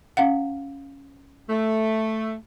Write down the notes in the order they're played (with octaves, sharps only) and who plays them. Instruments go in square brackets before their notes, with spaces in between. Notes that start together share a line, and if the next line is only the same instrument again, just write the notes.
[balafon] C#4 F5 F#5
[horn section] A3